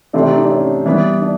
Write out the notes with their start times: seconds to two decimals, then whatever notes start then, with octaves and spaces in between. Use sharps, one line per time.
0.13 C3 E3 A3 C4 D4
0.26 D#4
0.38 D4
0.49 C#4
0.86 E3 G3 B3
1.21 D4